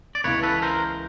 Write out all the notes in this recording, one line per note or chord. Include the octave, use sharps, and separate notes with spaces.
D5
C#2 C#3 E3 B4 C#5
A4 B4
A#4 C5